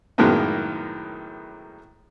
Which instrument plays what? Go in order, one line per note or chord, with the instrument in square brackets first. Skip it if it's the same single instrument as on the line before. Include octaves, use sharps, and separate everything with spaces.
[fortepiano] F#2 A2 D#3 G#3 A#3 B3